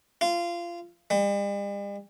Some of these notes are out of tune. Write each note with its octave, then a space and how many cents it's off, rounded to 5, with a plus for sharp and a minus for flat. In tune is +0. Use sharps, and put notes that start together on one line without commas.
F4 -20
G3 +45